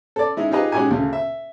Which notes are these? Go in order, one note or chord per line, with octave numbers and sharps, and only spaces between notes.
A4 D5
G#3 D#4 E4
D#4 F4 G4 G#4 B4 D#5
G#3 C#4 D#4 F#4 G4 G#5
D2 C#3
E5